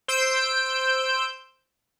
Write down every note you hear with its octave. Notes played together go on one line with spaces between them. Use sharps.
C5 E6 G6 D7